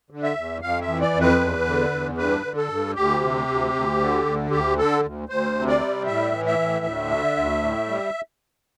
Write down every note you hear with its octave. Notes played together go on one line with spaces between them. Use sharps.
D3
E5
E2
F2 F5
E5
E3
D5
F2
B4
E2
D3
E2
G2 B4
D3
A4
G2
D2 G4
C3
D2
D2
D3
D2
D2 G4
D3 A4
D2
D2 C5
C3
D5
G3
A2 E5
E3
E5
A2
D2
D3
D2
A2
G3